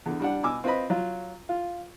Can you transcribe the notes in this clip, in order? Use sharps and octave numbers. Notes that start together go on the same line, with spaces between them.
E2 D3
G3 D4 F#5
B2 G#5 D6 E6
C4 F4 B4 D#5 B5
F#3 F4
F4